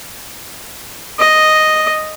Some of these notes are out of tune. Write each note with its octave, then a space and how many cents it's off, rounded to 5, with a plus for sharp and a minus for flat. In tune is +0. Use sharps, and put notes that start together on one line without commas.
D#5 +0